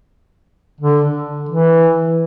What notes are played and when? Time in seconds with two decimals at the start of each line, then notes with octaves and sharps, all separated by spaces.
0.81 D3
1.49 E3